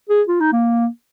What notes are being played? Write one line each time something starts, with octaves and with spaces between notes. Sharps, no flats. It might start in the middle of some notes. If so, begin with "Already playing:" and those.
G#4
F4
D#4
A#3